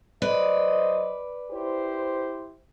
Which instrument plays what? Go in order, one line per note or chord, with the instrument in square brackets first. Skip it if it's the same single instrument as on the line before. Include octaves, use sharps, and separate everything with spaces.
[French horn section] F#3 C5 D#5 [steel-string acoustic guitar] B4 D5
[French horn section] E4 G4 C5